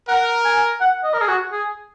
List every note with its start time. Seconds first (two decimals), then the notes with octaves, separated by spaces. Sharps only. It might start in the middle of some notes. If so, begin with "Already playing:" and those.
0.08 A#4 F#5
0.45 G#5
0.81 F#5
1.04 D#5
1.14 A#4
1.21 G#4
1.28 F#4
1.52 G#4